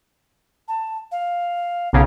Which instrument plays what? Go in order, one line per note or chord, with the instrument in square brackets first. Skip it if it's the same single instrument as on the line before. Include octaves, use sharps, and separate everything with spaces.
[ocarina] A5
F5
[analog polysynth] B1 C#3 [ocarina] F5